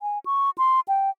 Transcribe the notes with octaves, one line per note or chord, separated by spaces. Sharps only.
G#5
C#6
C6
G5